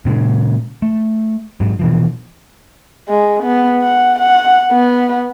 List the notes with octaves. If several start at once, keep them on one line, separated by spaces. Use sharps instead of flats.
A#2 C#3 G#3
A3
G#2 F#3
B2 E3 F3
G#3
B3
F#5
F#5
B3